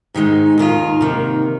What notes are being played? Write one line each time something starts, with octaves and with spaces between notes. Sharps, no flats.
G#2 D#3 G#3 D#4
D#2 D#3 A#3 F4
C3 D#3 A#3